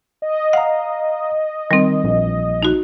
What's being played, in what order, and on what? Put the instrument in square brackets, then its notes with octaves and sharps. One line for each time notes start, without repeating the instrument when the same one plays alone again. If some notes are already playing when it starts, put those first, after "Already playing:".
[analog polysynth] D#5
[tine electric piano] F5 A#5 [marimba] F#5
[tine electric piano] D#3 [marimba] G3 C4
[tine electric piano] A#1
[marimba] D#4 F#4